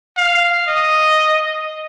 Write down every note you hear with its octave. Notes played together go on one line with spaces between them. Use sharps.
F5
D#5